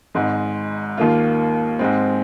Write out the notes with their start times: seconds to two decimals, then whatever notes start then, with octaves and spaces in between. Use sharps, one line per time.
0.15 G#1 G#2 G#3
0.97 D#2 D#3 A#3 F4
1.79 G#2 G#3 C4